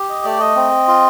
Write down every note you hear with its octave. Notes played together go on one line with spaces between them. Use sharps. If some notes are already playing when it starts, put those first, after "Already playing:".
Already playing: G4
D#5
A3 D5
D#5
C4
F4